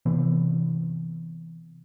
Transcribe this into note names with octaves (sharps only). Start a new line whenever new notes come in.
C3 E3 B3